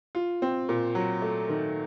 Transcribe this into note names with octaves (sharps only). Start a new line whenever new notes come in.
F4
C4
A#2
F#3
A3
D#3